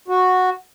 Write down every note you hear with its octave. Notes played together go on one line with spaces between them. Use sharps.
F#4